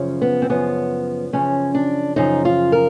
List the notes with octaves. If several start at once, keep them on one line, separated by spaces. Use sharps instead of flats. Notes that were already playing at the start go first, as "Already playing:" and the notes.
Already playing: F#2 C#3 F3
B3
C4
F#2 C#3 F3 B3
F#2 C#3 F3 C#4
D4
F#2 C#3 F3 D#4
F4
A#4